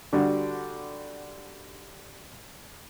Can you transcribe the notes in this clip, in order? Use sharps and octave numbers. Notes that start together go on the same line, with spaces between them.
D3 G3 D4 F#4